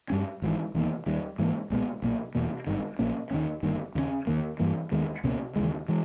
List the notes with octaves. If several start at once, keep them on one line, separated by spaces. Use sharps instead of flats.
G2 G3 C#4
G#1 G#2 E3
E1 E2 D#3 A#3
D#2 D#3 G3
G#2 E3 A#3
B1 A#2 G#3 B3
B1 A#2 A#3
E1 E2 B2 A#3
G#1 G2 D#3
A#1 A#2 A#3 C#4
D#2 D#3 G#3 C#4
G1 G2 D#3 A#3
D#2 C#3 G#3 C#4
D#2 D#3 A#3
G2 E3 A#3
D#2 D#3 G#3 B3
C#2 B2 A#3 C#4
D#2 C#3 E3 G#3
E3 G#3